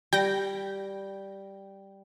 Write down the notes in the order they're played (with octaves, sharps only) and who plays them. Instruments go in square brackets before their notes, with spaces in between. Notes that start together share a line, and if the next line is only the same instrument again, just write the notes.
[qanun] G3 [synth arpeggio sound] G5 A#6